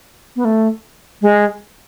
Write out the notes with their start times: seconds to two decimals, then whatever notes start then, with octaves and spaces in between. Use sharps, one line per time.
0.36 B3
0.45 A3
1.22 G#3